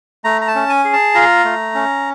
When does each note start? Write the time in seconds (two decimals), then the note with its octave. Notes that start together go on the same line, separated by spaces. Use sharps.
0.24 A3 A#5
0.41 A#5
0.48 A5
0.55 C#4
0.69 G#5
0.85 G#4
0.93 A5
1.15 F4 A#5
1.45 A3
1.75 C#4